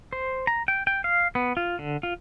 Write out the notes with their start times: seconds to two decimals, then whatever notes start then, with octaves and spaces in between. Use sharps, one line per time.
0.13 C5
0.47 A#5
0.68 G5
0.87 G5
1.04 F5
1.35 B3
1.57 F4
1.79 D3
2.03 F4